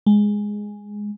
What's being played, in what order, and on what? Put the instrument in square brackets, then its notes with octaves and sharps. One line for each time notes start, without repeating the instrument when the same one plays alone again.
[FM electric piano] G#3